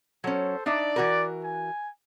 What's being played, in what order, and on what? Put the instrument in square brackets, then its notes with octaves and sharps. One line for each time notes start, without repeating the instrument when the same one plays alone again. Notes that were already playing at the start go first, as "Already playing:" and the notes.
[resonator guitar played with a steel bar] F#3 C#4 [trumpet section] A4 C5
[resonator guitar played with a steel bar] D4 D#4 E5 [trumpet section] D5
[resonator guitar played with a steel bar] E3 F#4 A#4
[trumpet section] G#5